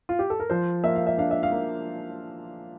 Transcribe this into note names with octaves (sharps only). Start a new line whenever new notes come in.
F4
G4
A4
A#4
F3 C5
A#3 E5
F5
E5
D4 F5
E5
F5
A#3